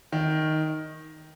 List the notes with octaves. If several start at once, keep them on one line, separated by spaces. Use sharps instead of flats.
D#3